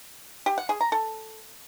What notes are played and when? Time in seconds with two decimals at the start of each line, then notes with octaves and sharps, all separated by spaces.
0.46 G4
0.58 F#5
0.69 G#4
0.81 A#5
0.92 A4